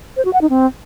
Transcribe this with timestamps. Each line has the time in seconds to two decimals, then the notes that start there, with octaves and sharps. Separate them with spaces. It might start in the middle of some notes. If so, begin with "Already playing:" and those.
0.17 C5
0.25 F#4
0.33 F#5
0.41 D#4
0.49 C4